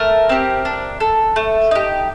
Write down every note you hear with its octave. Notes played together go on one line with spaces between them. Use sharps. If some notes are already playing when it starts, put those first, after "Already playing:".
Already playing: A3 A#4
C4 G4
D4
A4
A3
D#4 G4